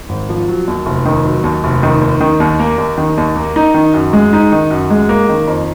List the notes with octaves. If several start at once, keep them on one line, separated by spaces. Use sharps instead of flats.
G#1
F3
F#3
D#2
F1
D#3
F#3
D#2
F1
D#3
D#2
D#3
D#2
A#3
D#2
D#3
D#2
A#3
D#4
D#3
F#2
G#3
D#4
D#3
F#2
G#3
A#3
D#3
F2